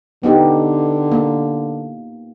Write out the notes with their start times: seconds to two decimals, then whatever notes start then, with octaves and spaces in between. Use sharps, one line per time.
0.23 D3 B3 D#4 G4
1.12 A#3